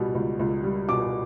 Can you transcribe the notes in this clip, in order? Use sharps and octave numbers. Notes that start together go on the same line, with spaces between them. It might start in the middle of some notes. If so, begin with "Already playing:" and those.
Already playing: C#2 B2 G3
C#2
C#2
G3
B2 D6